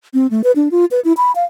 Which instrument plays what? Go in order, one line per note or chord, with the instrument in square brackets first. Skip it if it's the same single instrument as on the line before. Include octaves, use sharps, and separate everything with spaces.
[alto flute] C4
A3
B4
D4
F4
B4
E4
B5
F5